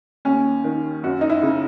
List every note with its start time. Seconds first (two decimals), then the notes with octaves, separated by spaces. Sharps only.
0.25 D#2 C#4
0.64 D#3
1.03 F#2 F#4
1.21 D#4
1.30 E4
1.43 C#3